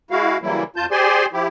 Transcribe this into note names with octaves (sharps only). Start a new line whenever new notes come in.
G#3 E4 F#4 F5
C#3 E3 F#3 G3 A#3 E4
F2 F4 A5 G6
G4 G#4 C5 D5 G#5 C6
F3 E4 G4